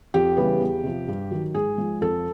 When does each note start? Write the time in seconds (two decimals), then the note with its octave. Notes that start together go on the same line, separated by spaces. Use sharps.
0.14 F2 G4
0.37 C#3 E3 G3 B3
0.61 E2
0.84 C3 F3
1.08 G2
1.31 D#3 F#3
1.54 G#2 G#4
1.78 F3 G#3
2.01 F2 A4